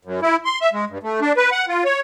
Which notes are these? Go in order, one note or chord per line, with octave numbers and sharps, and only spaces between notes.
F#2
E4
C6
E5
G#3
G2
A3
D4
B4
F#5
F4
C#5